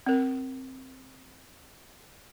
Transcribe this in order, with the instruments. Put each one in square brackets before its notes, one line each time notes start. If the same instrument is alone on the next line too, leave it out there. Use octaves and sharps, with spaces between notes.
[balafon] C4 A#4